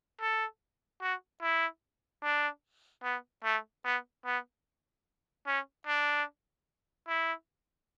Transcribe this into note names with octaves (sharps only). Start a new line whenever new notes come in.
A4
F#4
E4
D4
B3
A3
B3
B3
C#4
D4
E4